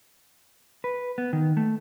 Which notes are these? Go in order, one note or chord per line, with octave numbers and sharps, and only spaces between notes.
B4
B3
D#3
A3